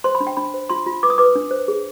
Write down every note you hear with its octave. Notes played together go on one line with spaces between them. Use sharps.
C5 C6
B5
D4
G5
D4 B5
C5
F4 C6
F4
B4 D6
D#6
B4 D6
D4
C5
G#4